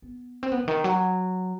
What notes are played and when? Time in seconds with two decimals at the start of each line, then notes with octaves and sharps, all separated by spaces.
0.02 B3
0.43 C4
0.52 B3
0.64 C3
0.68 D#3
0.84 F#3